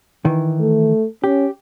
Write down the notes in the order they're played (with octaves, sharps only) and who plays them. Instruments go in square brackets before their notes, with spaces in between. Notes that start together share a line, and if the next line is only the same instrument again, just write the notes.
[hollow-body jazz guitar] D#3 E3
[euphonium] A3
[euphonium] C#4 [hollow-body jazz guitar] G4